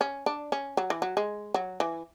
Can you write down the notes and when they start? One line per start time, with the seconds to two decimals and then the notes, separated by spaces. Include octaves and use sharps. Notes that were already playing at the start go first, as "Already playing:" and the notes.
0.01 C#4
0.26 D4
0.52 C#4
0.77 F#3
0.90 E3
1.02 F#3
1.17 G#3
1.54 F#3
1.80 E3